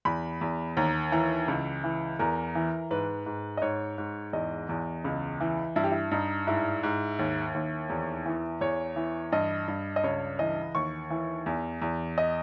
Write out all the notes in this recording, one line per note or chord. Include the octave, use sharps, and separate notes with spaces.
E2 B5
E2
D#2 A#5
E3 A#5
C#2
E3
E2 A#4
E3
G#2 B4
G#2
D#5
G#2 C#5
G#2
E2 D#5
E2
C#2
E3
G2 E4
G4
E4
G2 D#4
G#2 E4
G#2
D#2
D#2
E2
E3
E2 C#5
E3
G2 D#5
G2
D#5
C#2 C#5
E3 D#5
D#2 C#6
E3
E2
E2
D#5